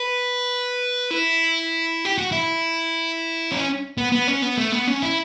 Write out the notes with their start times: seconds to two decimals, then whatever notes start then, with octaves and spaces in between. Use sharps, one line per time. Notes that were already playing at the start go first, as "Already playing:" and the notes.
Already playing: B4
1.11 E4
2.05 G4
2.18 F#4
2.32 E4
3.52 C#4
3.98 B3
4.12 B3
4.27 C#4
4.42 B3
4.57 A3
4.72 B3
4.87 C#4
5.03 E4